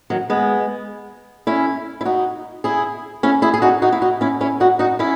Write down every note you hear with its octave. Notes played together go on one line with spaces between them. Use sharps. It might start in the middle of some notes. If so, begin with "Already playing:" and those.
D#3 F#3
G#3 B3
C#4 E4
E4
D#4 F#4
E4 G#4
C#4 E4
E4 G#4
G#4
D#4 F#4
D#4 F#4
E4
D#4 F#4
C#4 E4
C#4 E4
D#4 F#4
D#4 F#4
C#4 E4